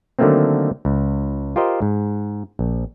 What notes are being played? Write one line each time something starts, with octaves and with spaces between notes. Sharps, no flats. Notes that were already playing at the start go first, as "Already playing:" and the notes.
D3 D#3 F#3 A3 A#3 C4
C#2
F4 G4 A#4 C5 D#5
G#2
A#1